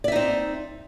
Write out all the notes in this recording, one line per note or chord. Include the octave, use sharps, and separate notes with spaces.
C4 D#4 D5 E5